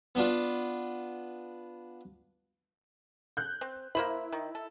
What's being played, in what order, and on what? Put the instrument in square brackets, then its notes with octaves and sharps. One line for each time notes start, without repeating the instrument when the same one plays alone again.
[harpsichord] B3 D4 F4
[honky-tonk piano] F#6 G6
[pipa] C4
[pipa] A#3 C5 B5 [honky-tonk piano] E4
[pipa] D#3
A4